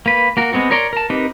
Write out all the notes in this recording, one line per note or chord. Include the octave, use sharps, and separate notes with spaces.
A#3 B4
A#3 F#4 A#4
G#3 B3 C4 F#4
A#4 C#5 D5 A#5 C6
A#4 A5
C4 D#4 G4 A#4 B4